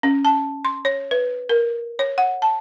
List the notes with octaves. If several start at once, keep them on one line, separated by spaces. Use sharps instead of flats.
C#4
A5
C6
C#5
B4
A#4
C#5
F#5
A5